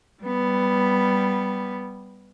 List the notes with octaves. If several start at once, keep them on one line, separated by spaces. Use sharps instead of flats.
G3 B3